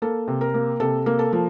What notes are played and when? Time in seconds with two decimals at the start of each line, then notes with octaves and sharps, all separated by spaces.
0.02 A#3 A4
0.28 C3
0.41 A#4
0.54 A#3
0.80 C3 A4
1.06 A#3
1.19 A4
1.33 F3